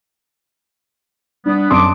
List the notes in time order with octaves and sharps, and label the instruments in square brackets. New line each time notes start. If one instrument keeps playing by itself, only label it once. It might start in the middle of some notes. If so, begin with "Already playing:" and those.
[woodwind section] G3 B3 [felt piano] D4
[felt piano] F#2 C6 D#6 [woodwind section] A5 D6